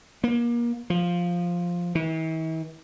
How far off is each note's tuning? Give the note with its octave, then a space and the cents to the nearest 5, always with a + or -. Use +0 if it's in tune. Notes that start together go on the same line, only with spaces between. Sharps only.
A#3 +30
F3 +5
E3 -45